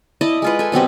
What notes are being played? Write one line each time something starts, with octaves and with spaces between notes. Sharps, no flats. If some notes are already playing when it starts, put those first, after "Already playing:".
E4 D5 D#5 A5
G#3 F4 B4
A4 G#5
B2 F#3 C4 G4